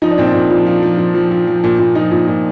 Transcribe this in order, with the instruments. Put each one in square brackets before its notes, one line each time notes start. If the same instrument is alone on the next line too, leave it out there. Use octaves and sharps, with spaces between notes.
[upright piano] F3 D#4
D4
A#2 C4
D4
A#2
F3
F3
F3
F3
F3
F3
F3
A#2
A#2
F3 D#4
A#2
A#2